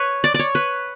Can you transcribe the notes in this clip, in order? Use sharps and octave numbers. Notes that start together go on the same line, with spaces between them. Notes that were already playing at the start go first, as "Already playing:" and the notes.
Already playing: B4 C#5
D5
C#5 D5
B4